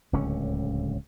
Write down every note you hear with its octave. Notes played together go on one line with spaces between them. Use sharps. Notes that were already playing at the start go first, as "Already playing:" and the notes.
D1 C#2 D3 C#4